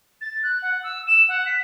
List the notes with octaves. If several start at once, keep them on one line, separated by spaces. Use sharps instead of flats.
A6
F#6
F#5
E6
E7
F#5
B6